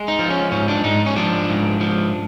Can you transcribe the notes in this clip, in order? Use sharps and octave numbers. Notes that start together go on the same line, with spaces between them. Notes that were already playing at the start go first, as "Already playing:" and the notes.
Already playing: G#3
D#4
F3
C#4
G#2 C#4
D4
G#2 D#4
C#4
F3 D4
G#2
F3